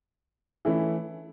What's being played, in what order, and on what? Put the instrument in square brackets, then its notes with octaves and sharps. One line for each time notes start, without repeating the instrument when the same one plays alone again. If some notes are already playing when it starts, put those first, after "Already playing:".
[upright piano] E3 A3 C#4 E4